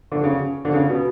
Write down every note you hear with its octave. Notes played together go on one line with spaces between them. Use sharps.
D3
C#3
D3
C#3
B2